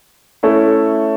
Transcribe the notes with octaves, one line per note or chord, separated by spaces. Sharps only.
A3 C#4 E4 A4 C#5